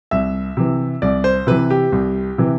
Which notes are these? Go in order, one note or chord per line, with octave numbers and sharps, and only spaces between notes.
C2 E5
C3 E3
C2 D5
C5
C3 E3 B4
G4
C2
C3 E3